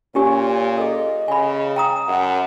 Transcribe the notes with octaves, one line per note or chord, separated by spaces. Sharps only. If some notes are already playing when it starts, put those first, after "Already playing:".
A#2 C#4 G4 C#5 G#5
G#4 A4 D#5
C#3 G#5 B5
G5 A#5 D#6
F#2 F#5